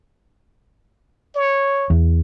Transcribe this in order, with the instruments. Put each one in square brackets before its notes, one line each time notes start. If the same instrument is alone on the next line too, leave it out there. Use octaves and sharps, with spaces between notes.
[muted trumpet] C#5
[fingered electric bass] E2